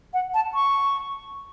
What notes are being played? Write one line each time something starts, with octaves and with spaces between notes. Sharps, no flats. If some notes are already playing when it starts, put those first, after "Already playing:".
F#5
A5
C#6